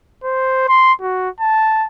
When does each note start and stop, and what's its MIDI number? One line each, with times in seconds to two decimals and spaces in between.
0.24 0.64 72
0.68 0.93 84
1.02 1.29 66
1.41 1.87 81